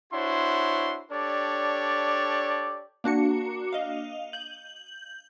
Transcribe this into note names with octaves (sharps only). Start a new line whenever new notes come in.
D4 E4 F#4 C5 C#5 C6
D4 G4 A4 C#5 D5
A#3 D4 F#4 C#7
D#5 F5
G6 F#7